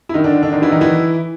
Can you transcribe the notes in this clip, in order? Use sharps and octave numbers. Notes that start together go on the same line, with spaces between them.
E4
D#3 D#4
D3 D4
D3 D4
D#3 D#4
E3 E4
D#3 D#4
E3 E4